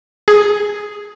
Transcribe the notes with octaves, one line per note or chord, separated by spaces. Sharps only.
G#4